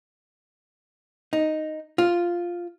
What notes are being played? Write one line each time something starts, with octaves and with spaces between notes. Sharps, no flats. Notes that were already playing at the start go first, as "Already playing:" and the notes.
D#4
F4